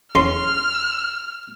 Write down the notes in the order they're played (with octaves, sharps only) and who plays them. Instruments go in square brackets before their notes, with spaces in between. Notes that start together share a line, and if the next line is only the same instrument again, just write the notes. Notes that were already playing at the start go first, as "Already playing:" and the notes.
[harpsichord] E2 C#4 [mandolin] C6 [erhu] F6